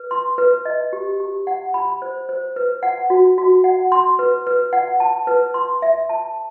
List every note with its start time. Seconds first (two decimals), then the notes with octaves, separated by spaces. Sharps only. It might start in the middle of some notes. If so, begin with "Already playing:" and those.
Already playing: B4
0.11 C6
0.38 B4
0.65 D#5
0.93 G4
1.20 G4
1.47 F#5
1.74 B5
2.02 C5
2.29 C5
2.56 B4
2.83 F#5
3.10 F#4
3.38 F#4
3.64 F#5
3.92 C6
4.19 B4
4.47 B4
4.73 F#5
5.00 A5
5.27 B4
5.54 C6
5.82 E5
6.09 A5